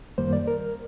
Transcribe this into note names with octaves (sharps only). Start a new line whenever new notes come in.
F#2 D#3 G3 A#3 C5
D5
A#4